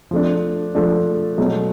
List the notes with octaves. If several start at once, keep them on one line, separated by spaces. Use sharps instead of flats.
F3 A3 D4
F3 A3 D4
B2 F#3 A3